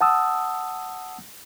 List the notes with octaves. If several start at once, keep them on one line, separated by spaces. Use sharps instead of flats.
F#5 A5 D#6 E6